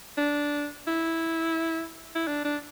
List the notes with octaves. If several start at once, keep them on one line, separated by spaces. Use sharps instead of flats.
D4
E4
E4
D4
D4